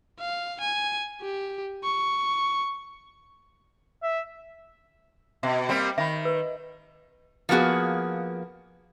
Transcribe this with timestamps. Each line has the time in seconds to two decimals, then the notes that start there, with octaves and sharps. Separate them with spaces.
0.20 F5
0.60 G#5
1.22 G4
1.84 C#6
4.03 E5
5.43 B2 E5
5.69 G3 A#3 C4
5.98 D#3 E5 B5
6.25 B4
7.49 F3 A#3 B3 F#4 G#4